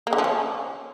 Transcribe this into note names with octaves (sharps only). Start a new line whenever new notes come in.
A#3
D3
F3
C#4